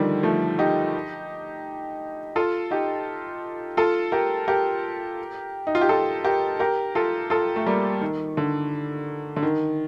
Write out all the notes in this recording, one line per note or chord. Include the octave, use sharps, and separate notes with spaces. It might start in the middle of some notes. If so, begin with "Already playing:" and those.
Already playing: D3 D#3 F3 G3
F3 A3
D#4 G4
F4 A4
D#4 G4
F4 A4
G4 A#4
G4 A#4
D#4
F4
G4
F4 A4
G4 A#4
G4 A#4
F4 A4
F4 A4
A3
G3 A#3
D#3
D3
D3
D#3